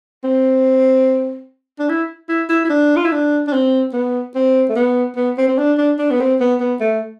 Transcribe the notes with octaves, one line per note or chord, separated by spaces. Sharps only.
C4
D4
E4
E4
E4
E4
D4
F4
E4
D4
D4
C4
B3
C4
A3
B3
B3
C4
C4
D4
D4
D4
B3
C4
B3
B3
A3